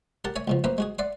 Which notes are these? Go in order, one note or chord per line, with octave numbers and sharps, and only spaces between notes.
G4 A#4 F#5 A5
C#5 E5 G#5 C#6
C#2 B2 F3
F#2 A#3 B4 C5 E5 A#5
G#3 F#4 G#4
D5 E5 F#5 C6 D6